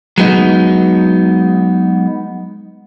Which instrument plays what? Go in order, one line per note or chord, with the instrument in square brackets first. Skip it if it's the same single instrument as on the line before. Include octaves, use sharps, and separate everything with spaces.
[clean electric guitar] F#3 G#3 B3 D#4